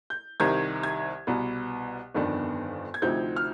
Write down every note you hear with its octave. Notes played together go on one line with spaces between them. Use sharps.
G6
C2 C3 D#3 G#6
G#6
C2 B2 B3
G1 F2 D#3 B3 D4
G#6
D2 C3 F3 C4 D#4 G6
F6